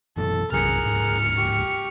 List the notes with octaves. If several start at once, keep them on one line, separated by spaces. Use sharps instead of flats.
F#2 B2 E3 A4
B1 F#2 C3 G#4 A#4 F6 F#6 C#7
D1 G#2
G4 C#6